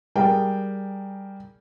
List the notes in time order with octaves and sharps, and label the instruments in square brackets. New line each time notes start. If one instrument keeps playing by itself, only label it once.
[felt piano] G3 G#4 A#4 G5